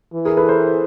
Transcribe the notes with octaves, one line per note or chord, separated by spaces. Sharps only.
E3
G#4 A#4
A4 B4
A#4 C5